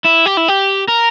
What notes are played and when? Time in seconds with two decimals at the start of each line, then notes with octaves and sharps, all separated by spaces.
0.05 E4
0.26 G4
0.37 E4
0.48 G4
0.88 A#4